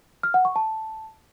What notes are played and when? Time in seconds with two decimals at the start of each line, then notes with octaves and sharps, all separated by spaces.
0.23 F6
0.34 F#5
0.45 C#6
0.56 A5